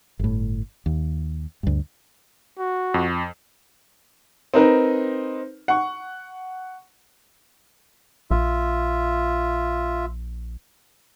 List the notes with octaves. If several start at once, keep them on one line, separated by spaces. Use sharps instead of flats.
G1 A2
D#2
D2 G2
F#4
F2
C4 D#4 A#4 B4
F#5 C#6
A#1 F4 E5